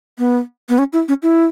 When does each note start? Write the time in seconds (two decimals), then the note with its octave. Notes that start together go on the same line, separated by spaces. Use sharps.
0.18 B3
0.69 B3
0.78 C#4
0.93 E4
1.08 C#4
1.23 E4